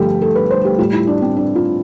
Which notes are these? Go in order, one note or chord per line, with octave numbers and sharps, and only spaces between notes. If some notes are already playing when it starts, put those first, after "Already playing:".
Already playing: G2 D3 F3 A3 G4 A4
A4
B4
C5
G4
A2 G3 F4
E4
D4
C4
D4
F4